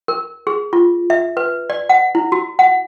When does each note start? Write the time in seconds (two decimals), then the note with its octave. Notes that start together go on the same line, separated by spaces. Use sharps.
0.08 A#4
0.47 G#4
0.73 F4
1.10 E5
1.37 B4
1.70 D5
1.89 F#5
2.15 E4
2.32 F#4
2.59 F#5